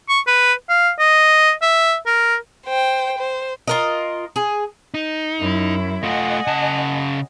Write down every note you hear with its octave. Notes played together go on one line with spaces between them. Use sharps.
C#6
B4
F5
D#5
E5
A#4
C5 G5
C5
F4 A#4 D#5
G#4
D#4
F#2 E4
A3 F4 D#5 F#5 G#5
C#3 A5